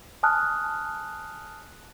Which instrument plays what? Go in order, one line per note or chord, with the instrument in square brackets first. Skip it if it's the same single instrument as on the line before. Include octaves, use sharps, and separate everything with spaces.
[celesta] G#5 A5 D#6 F6 F#6